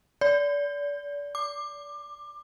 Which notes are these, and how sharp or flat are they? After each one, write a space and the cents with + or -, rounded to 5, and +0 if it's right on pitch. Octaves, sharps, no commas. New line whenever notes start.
D5 -30
D6 +20